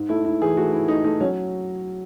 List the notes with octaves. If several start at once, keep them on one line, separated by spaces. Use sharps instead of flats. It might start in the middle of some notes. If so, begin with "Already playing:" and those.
Already playing: G#2
A3 E4
G#2 E4
E3 G#4
A3 F#4
G#2 E4
A3 D#4
A3 D#4
F#3 C#4